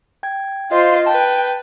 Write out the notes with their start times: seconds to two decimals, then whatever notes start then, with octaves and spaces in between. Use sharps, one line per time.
0.23 G5 G#6
0.71 F4 C5 D#5
1.06 B4 G5 A5